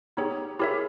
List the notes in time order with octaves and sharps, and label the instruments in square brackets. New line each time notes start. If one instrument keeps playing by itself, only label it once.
[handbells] B3 D#4 G#4 C#5 [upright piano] G4
[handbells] E4 G4 A#4 C#5 E5 [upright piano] G#4